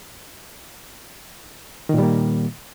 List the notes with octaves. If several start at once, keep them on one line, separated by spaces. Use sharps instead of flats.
A#2 D#3 G3 A#3